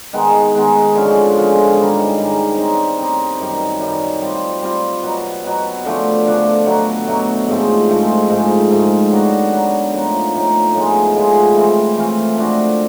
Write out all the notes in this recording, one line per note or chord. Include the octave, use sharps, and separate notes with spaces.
D#3 G#3 B3
D#3 G#3 B3
D3 F3 G#3 C#4
D3 F3 G#3 C#4
G#2 D#3 G3
G#2 D#3 G3
G3 C4 D#4
G3 C4 D#4
F#2 D#3 G3
F#2 D#3 G3
G3 C4 F4
G3 C4 F4
B2 F#3 B3
B2 F#3 B3
D3 F3 A3 D4
D3 F3 A3 D4
B2 F#3 A3
B2 F#3 A3
G#2 F3 A3 C4
G#2 F3 A3 C4
G#2 F3 A3
G#2 F3 A3
F#3 B3 D4 F#4
F#3 B3 D4 F#4
A2 F3 A#3 D#4
A2 F3 A#3 D#4
A2 F3 G#3 B3
A2 F3 G#3 B3
E3 A3 C4 F4
E3 A3 C4 F4
F3 A3 D4 F#4